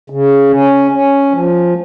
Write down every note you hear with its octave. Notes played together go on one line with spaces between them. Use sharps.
C#3
C#4
C#4
F3